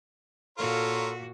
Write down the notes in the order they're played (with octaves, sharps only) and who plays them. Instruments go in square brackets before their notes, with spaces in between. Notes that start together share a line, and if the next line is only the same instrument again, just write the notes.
[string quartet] A#2 F#4 [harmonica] F4 A#4 C#5 [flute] A4